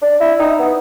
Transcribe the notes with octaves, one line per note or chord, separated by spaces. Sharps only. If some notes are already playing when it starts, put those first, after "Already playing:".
D4
E4
D#4
B3